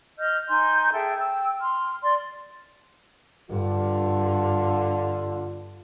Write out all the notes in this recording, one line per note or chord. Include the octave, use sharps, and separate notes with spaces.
D#5 F6 G6
D#4 G#5 C6 G6
G#4 A4 E5 G5
G5 E6
C6 F6
D5 C6
G2 D3 F4